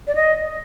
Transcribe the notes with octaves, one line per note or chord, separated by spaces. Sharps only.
D5
D#5